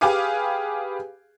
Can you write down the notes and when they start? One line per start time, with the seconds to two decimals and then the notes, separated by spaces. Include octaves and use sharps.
0.01 G4 G#4 B4 F5 G#5 D6